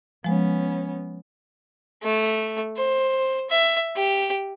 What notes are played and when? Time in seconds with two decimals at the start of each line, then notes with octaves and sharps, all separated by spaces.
0.24 F3 G#3 B3 C#4
2.03 A3
2.77 C5
3.50 E5
3.96 G4